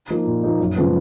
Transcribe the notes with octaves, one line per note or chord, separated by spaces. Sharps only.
F3 A#3 D#4
A#2
F3 A#3 D#4
F#2
C#3 F3 G#3 B3